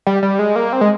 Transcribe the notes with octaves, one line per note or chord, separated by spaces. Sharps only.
G3
G3
G#3
A#3
C4
G#3